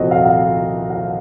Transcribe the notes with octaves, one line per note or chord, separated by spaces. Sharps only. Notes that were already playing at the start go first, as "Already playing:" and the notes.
Already playing: C2 A#2 F3 C4 F#4 A4 C5 D#5
F5
F#5
F5
F5